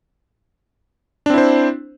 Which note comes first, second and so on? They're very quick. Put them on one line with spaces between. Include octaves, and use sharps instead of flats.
D4 C4 E4 C5